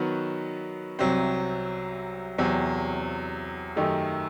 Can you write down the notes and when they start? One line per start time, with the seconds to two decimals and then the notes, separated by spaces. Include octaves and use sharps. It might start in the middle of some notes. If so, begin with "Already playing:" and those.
Already playing: D#3 F#3 B3 F#4 B4
0.99 C2 C3 F#3 C4
2.38 E2 C3 F#3 C4
3.76 F#2 D#3 A3 D#4 G4